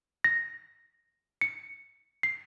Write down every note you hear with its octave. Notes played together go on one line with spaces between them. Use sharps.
A#6
C#7
C7